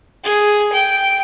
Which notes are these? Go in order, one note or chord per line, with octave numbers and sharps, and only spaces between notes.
G#4
G5